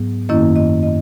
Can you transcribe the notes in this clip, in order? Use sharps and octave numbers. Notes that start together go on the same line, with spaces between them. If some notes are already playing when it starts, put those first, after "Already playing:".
Already playing: G#2 F#3 B3
F#2 D#3 A#3 C#4 E4 D#5
D#5
D#5